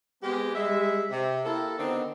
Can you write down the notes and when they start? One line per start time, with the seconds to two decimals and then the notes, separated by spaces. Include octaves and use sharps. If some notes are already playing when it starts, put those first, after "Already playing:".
0.22 G#3 B3 C4 G4
0.54 G3 G#3 E5
1.10 C3
1.45 A#3 E4 G4 A4
1.78 D3 D#3 B3 C4 D4 D#4